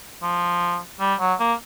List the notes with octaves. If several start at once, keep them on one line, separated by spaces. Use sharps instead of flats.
F3
G3
F#3
A#3